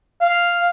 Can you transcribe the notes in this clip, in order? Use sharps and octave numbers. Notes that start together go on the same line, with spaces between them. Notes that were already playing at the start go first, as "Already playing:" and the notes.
F5